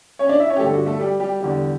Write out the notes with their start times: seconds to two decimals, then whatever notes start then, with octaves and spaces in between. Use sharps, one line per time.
0.19 C#4 C#5
0.29 D4 D5
0.40 E4 E5
0.50 C#4 C#5
0.57 G4
0.59 G2 D3 G3 A3 A4
0.74 F#4
0.86 A3 A4
1.00 G3 G4
1.20 G3 G4
1.40 E2 D3 G3